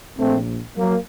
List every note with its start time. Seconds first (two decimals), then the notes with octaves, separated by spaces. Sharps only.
0.18 A#1 A#2 A3 C4
0.77 F#3 A#3